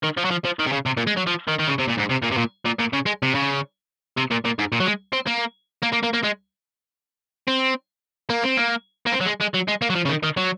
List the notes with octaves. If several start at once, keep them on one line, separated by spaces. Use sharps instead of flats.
D#3
F3
F#3
F3
F3
D#3
C3
C#3
C3
A#2
G#3
F#3
F3
D#3
D#3
C#3
C3
A#2
G#2
C3
A#2
C3
A#2
A#2
A#2
C#3
G#3
C3
C#3
C3
A#2
A#2
G#2
A#2
F#3
G#3
C4
A#3
A#3
A#3
A#3
A#3
G#3
C4
A#3
C4
A#3
A#3
C4
F#3
G#3
G#3
F#3
G#3
A#3
F#3
F3
C#3
D#3
D#3
F#3